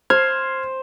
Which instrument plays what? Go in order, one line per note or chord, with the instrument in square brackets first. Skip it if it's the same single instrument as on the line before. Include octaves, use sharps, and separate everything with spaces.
[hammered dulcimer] C5 [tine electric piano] F6 G#6